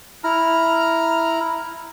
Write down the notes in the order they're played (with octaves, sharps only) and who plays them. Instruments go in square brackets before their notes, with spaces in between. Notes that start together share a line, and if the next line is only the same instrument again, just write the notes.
[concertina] E4 A#5 F6